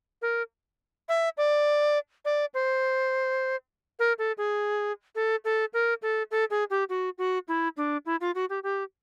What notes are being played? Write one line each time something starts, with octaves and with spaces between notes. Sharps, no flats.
A#4
E5
D5
D5
C5
A#4
A4
G#4
A4
A4
A#4
A4
A4
G#4
G4
F#4
F#4
E4
D4
E4
F4
F#4
G4
G4